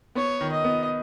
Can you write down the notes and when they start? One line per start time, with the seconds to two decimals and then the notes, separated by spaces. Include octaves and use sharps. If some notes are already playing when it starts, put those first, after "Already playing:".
0.15 B3 C#5
0.41 D#3
0.52 D#5
0.64 B3